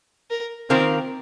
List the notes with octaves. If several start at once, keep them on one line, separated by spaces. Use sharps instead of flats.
A#4
D#3 A#3 C4 F4 A#4